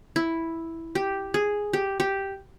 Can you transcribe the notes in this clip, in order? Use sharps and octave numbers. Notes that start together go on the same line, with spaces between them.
E4
G4
G#4
G4
G4